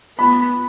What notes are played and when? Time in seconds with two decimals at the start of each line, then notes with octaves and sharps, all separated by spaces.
0.18 B3 B5